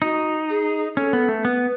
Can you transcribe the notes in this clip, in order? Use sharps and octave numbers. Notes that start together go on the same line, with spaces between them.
D#4 F#4
G#4
C#4 A4
B3
A3
B3 B4